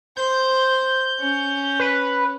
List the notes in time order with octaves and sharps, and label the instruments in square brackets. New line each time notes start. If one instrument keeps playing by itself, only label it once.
[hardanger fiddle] C5 [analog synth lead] G6
[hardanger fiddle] C#4
[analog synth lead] B4